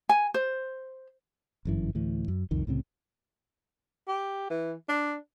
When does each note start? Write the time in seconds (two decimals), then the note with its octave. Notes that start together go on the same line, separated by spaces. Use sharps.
0.09 G#5
0.34 C5
1.65 G1 F#2 E3
1.95 D2 A2 E3
2.28 F#2
2.51 C2 F2 D#3
2.67 C2 A2 C#3 C4
4.08 G4
4.50 E3
4.89 D4